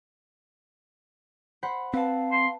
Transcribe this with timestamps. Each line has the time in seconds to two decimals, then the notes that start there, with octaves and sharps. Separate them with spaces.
1.63 C5 F#5 B5
1.94 C4 B4 F5 A5
2.32 C6